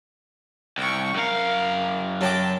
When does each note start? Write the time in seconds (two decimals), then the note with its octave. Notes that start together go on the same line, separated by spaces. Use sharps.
0.78 C2 G5 C#6
1.15 F#2 A#4 F5
2.21 F#3 G5 A5 D6